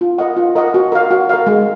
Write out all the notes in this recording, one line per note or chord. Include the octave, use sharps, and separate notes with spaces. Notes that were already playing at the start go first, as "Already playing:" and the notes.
F4
A#4 D#5 F#5
F4
A#4 D#5 F#5
F#4
A#4 F5
F#4
A#4 F5
G#3